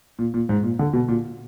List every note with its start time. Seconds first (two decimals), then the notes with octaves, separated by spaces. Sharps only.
0.19 A#2
0.34 A#2
0.49 G#2
0.63 A#2
0.79 D3
0.93 B2
1.08 A#2